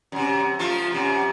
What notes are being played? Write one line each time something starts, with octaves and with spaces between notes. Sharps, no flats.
F#2 C3
F3 A3 F4
F#2 C3